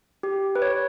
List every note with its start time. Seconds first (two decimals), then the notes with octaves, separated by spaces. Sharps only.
0.23 G4
0.56 B4
0.62 C#5